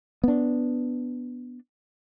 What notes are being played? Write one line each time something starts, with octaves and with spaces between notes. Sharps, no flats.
B3 D4